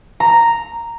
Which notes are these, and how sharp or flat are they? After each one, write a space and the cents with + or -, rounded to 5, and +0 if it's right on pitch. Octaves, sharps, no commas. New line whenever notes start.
A#5 -5